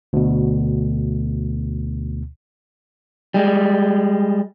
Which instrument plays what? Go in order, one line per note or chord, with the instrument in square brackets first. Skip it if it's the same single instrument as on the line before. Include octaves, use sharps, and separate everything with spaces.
[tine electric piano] D2 B2
[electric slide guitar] G3 G#3